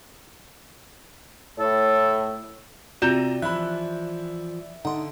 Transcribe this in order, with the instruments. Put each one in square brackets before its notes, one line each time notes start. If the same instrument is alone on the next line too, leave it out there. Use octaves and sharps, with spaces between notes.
[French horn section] A2 C#5 [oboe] A4
[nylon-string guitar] C3 [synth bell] C4 F4 F#4 [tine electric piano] D5 [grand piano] A#5 G6 E7
[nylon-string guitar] E3 F3 [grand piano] E4 B5 [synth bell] F#6
[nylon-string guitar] D3 [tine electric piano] D#4 [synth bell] F#5 C6